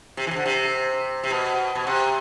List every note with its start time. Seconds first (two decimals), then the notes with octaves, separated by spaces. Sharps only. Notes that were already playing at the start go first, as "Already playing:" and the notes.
0.17 C3
0.27 E3
0.31 C3
0.36 D3
0.45 C3
1.23 C3
1.30 B2
1.75 B2
1.87 C3